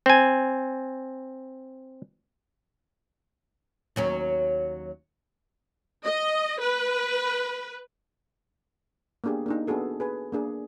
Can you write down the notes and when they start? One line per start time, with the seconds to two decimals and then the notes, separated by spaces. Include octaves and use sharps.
0.06 C4 G#5
3.96 D#2 F#3 C#4
6.05 D#5
6.61 B4
9.24 A#3 B3 D4 G4 G#4
9.46 A#3 D4 D#4
9.67 B3 D4 F#4 G#4 A4
10.00 G#4 B4 G#5
10.32 A#3 D4 G#4